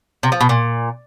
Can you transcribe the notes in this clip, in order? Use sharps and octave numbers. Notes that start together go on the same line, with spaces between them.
C3
F3
B2
A#2